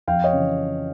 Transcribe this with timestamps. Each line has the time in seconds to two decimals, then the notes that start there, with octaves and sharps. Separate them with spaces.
0.07 F2 F5 G5
0.24 C#5 D#5
0.33 C#3 E3